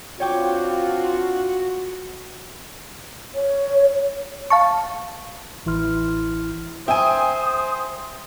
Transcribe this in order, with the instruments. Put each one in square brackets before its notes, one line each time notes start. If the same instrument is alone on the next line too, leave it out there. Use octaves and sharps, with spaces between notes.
[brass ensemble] C4 D4 F4 [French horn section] F#4 [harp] C#5 G5 D6
[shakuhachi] C#5
[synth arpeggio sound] F5 A5 C#6
[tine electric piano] A1 E3 E4 C6 F6
[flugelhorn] C5 [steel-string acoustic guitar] E5 [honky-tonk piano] G5 G#5 [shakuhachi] D#6